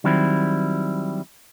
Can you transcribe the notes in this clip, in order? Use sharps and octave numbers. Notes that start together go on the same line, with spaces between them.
D#3 F#3 G3 C4 E4